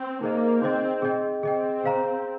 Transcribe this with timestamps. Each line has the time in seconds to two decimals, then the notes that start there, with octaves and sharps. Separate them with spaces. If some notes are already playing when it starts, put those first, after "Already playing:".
Already playing: C4
0.21 A#3 D#4 G#4 C5 D#5
0.62 C4 D#4 G#4 C5 D#5
1.02 G#4 D#5 G5
1.43 C4 G#4 D#5 G5
1.84 G#4 C5 F5 A#5